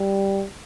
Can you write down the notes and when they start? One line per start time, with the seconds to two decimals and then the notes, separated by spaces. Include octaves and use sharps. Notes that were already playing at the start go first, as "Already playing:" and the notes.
Already playing: G3